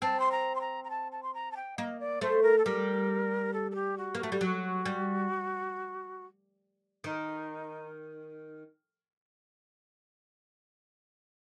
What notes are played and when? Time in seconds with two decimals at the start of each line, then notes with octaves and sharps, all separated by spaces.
0.02 C4 A5
0.20 C6
0.31 A#5
0.55 C6
0.61 A#5
0.84 A#5
0.90 A5
1.12 A5
1.23 C6
1.34 A#5
1.51 A5
1.56 G5
1.78 A#3 D#5
2.00 D5
2.21 A3 C5
2.43 A#4
2.58 A4
2.65 G3 A#4
3.53 A4
3.71 A4
3.75 G4
3.98 F#4
4.15 A#3
4.19 A3 F#4
4.32 G3
4.41 F#3 F#4
4.85 G3
7.04 D#3 D#4